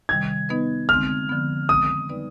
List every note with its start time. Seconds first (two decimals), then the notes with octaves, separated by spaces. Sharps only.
0.09 C3 D#3 G3 G#6
0.49 B3 D#4 B4 D#5
0.89 D3 G#3 C4 F6
1.29 D3 F3 B3
1.69 D#3 G#3 C4 D#6
2.09 G3 B3 D#4 B4 D5